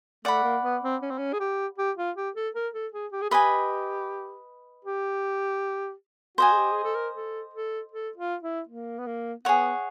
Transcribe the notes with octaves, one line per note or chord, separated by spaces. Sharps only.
A3 D5 F#5 B5
A#3
B3
C4
C#4
C4
C#4
G#4
G4
G4
F4
G4
A4
A#4
A4
G#4
G4
G#4
G4 B4 D#5 G#5 B5
G4
F#4 C5 D#5 G#5
G#4
G4
G#4
A4
A#4
A4
A4
A4
F4
E4
A#3
B3
A#3
B3 G#4 C#5 F#5